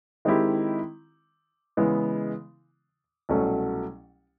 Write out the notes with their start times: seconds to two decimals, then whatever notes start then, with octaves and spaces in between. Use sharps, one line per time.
0.25 D#3 G#3 C4 E4 G4
1.77 C#3 E3 G#3 B3 E4
3.29 C2 B2 F#3 A3 C#4